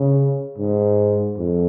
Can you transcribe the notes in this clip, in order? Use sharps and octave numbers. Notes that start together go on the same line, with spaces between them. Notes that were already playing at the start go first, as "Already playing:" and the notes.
Already playing: C#3
G#2
F2